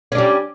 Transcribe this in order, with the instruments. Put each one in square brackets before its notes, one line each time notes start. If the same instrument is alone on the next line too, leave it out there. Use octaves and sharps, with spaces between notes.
[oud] C#4
D4
G3